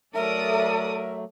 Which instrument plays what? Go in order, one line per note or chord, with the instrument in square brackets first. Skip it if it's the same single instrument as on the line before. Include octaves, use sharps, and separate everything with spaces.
[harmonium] F#3 A3 [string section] A4 D5 D#6 [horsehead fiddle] A#4 [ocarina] E5